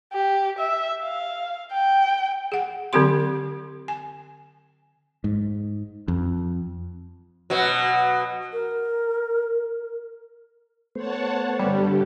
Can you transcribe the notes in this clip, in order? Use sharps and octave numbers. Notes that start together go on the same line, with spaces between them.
G4
E5
F5
G5
G#4 F#5
D3 F#3 C4 G4 C6
G#5
G#2
F2
B2 F#3
A#4
A3 B3 C5 C#5 F#5 A5
G2 D3 G3 G4